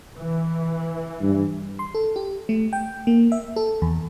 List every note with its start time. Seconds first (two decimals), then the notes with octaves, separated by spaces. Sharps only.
0.15 E3
1.22 G2
1.79 C6
1.95 A4
2.16 G4
2.49 A3
2.73 G5
3.07 A#3
3.32 E5
3.56 A4
3.82 E2